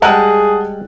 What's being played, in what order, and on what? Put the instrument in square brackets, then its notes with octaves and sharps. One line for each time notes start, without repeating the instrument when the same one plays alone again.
[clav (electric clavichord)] G3 G#3 [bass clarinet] G#4 [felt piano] F#5 A5 F#6